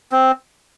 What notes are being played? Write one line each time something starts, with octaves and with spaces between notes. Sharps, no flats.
C4